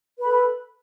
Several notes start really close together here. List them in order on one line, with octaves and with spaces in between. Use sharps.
B4 B5 A4